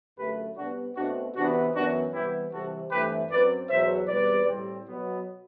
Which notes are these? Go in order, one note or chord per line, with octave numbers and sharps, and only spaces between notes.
F#2 D3 A3 G4 B4
C3 G3 B3 D4 F#4
B2 A3 C4 D4 F#4
C3 E3 B3 D4 F#4
F#2 E3 B3 D4 F#4
C3 E3 G3 B3 E4 G4
C3 E3 G3 C4 F#4 A4
G2 E3 A3 C4 G4 B4
F#2 F#3 C4 B4 D5
E2 B2 F#3 C5 E5
E2 B2 G3 C4 B4 D5
A2 G3 C4
B2 F#3 B3